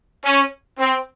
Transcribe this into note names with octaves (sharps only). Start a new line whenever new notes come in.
C#4
C4